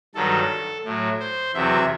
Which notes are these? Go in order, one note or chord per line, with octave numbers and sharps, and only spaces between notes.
G2 D#3 F#3 A4
A2 F#3
C5
E2 C3 F#3 E5